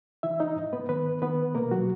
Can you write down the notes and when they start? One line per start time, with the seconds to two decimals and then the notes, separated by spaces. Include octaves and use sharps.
0.23 E3 E4 E5
0.40 D#4 D#5
0.56 G#2
0.73 B3 B4
0.89 D#3 B3 B4
1.22 D#3 B3 B4
1.55 B2 A#3 A#4
1.71 F#3 F#4